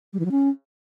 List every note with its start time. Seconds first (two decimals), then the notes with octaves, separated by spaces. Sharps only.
0.13 G3
0.19 E3
0.25 F#3
0.31 C#4